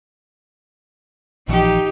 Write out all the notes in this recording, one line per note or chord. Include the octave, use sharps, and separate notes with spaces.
A#1 E3 F3 D#4 G4